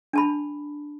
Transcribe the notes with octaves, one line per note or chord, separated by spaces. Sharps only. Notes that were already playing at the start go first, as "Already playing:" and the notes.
D4 A5 B5